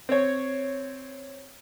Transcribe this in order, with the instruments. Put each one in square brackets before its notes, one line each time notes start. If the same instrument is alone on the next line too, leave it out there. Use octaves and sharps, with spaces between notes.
[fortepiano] C4 C#5